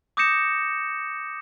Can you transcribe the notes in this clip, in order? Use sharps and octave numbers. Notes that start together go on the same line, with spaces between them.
D6 D#6 G6 A#6 C#7 E7